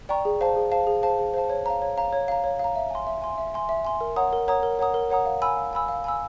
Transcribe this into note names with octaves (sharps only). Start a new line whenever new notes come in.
D5 G5 A#5 C#6
G#4
C5 F5 A5
G#4
C5 F5 A5
G#4
C5 F5 A5
G#4
C5 F5 A5
C#5
F5 A#5
C#5
F5 A#5
C#5
F5 A#5
C#5
F5 A#5
E5
G#5 C6
E5
G#5 C6
E5
G#5 C6
E5
G#5 C6
A#4
C#5 F#5 A#5 D#6
A#4
C#5 F#5 A#5 D#6
A#4
C#5 F#5 A#5 D#6
A#4
C#5 F#5 A#5 D#6
F5
G#5 B5 E6
F5
G#5 B5 E6
F5
G#5 B5 E6